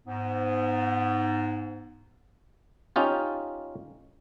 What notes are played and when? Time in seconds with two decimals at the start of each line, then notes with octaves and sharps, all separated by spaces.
0.07 G#2 B3
2.96 C#4 D#4 F4 G4